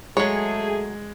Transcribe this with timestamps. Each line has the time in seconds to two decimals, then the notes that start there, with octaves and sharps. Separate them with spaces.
0.17 F#3 G#3 A3 G#4 C#5